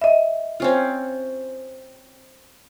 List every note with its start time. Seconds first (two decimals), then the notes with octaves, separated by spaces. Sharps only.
0.01 D#5 E5
0.60 C4 C#4 F4